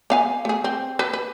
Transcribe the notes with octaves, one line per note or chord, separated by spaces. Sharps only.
B3 F5 G#5
A3 G#4
C4
B4
B4